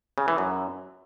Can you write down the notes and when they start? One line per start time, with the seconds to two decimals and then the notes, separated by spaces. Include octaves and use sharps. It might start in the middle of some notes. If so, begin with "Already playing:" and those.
0.18 C#3
0.28 E3
0.38 F#2